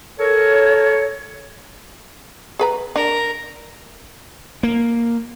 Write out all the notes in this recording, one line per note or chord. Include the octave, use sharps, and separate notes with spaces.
A4 A#4 C#5
G#4 B4 A#5
D4 A#4
A#3